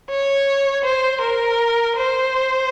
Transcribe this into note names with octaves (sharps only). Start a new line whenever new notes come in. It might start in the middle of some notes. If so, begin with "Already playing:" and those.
C#5
C5
A#4
C5